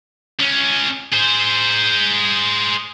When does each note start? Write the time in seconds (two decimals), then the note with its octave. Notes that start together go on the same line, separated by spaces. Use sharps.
0.40 C#2 C#4
1.12 G#4 C5